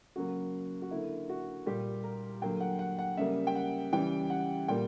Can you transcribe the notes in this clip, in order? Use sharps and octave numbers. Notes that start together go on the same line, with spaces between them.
C#3 F#3 A#3 F#4
F#4
D3 A#3 E4
F#4
A#2 G3 A#3 G4
A#4
D3 F#3 A#3 G5
F#5
F#5
F#5
C#3 G3 A#3 E5
G5
F#5
C#3 E3 G3 G5
F#5
A#2 G3 A#3 G5